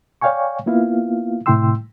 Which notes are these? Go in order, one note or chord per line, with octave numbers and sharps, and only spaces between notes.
C#5 D5 F5 G5 G#5 C#6
A#3 B3 E4 F4 F5
A2 C3 E4 G5 C6 E6